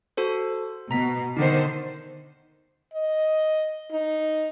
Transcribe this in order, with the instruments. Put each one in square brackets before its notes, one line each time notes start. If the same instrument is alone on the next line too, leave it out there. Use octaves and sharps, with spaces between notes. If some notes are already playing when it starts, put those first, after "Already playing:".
[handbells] F#4 A4 C5
[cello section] B2 [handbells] A#5 B6
[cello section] D3 D#3 C5 [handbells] D#4
[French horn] D#5
D#4